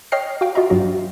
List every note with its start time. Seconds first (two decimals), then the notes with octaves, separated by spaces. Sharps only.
0.12 C#5 D#5 G5 F6 A#6 C7
0.41 F#4 F5 G5
0.55 F4 F#4 D#5 E5 A#5
0.70 G2 F#3 F#4